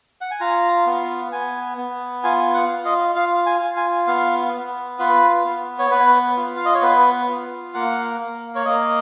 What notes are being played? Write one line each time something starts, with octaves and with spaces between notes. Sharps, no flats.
F#5
G#5
F4 A#5
B3
B3 G#5
B3
F4 G#5
F#5
F4
D#5
F4 F5
G#5
F4
G#5
B3 F5
B3
F4 B4
B3
C#5
B3 B4
F4
F5
D#5
C#5
B3 B4
F4
A#3 F#5
A#3
C#5
A#3 D#5